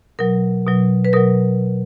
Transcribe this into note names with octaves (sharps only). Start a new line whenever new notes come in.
B2 F#3 A#4
B2 F#3
B4
B2 F#3 A#4